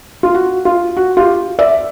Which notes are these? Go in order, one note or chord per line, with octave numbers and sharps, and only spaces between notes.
F4
F#4
F4
F#4
F4 G4
D5 E5